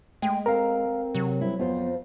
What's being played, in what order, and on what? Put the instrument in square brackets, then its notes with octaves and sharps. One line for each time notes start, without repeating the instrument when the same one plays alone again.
[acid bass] G#3 [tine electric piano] A3 [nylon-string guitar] G5
[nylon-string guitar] C4 A4 [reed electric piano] A#4 [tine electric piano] F5 A#5
[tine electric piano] C3 [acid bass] F#3
[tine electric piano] G3 [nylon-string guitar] C4 E4
[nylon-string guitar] F2 F4 C5 [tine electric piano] B3